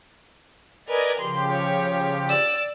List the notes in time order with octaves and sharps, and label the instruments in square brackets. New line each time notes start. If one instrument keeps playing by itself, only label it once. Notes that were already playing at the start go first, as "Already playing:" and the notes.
[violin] A#4 B4 [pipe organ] D5 D#5 G#5
[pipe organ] C#3 F3 G4 [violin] C6
[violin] C#5
D5 E6